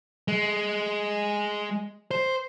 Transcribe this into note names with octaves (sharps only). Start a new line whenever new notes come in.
G#3
C5